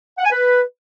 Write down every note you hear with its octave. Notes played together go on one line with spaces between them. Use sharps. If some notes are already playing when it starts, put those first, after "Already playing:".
F#5
G#5
B4